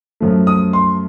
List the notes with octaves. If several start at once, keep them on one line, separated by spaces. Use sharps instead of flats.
F#2 F3 A3
D#6
C6